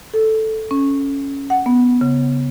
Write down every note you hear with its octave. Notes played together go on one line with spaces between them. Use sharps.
A4
C#4
F#5
B3
C#3